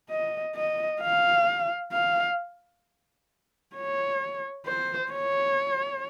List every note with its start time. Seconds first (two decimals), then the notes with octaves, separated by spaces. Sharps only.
0.10 D#5
0.55 D#5
1.01 F5
1.92 F5
3.75 C#5
4.66 C5
5.12 C#5